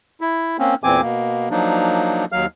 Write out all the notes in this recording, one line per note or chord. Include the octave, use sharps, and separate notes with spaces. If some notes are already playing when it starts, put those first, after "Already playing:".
E4
A#3 C4 C#4
E2 A#2 E3 C4 G#5 D6
B2 A#3
F3 F#3 A#3 D4 D#4
D#2 F#3 F5 F6